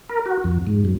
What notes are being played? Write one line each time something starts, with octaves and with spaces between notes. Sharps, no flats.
A#4
F#4
F2
G#2
F#2